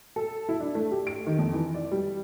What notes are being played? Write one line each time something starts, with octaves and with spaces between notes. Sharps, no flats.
A4
E4
D4
A3
G4
D7
D#3
F2
E3
D5
G3